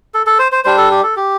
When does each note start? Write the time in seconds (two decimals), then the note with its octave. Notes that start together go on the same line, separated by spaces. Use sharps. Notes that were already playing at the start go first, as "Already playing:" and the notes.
0.14 A4
0.26 A4
0.39 C5
0.52 C5
0.64 G3 D4 C5
0.77 A4
0.91 G4
1.03 A4
1.16 G4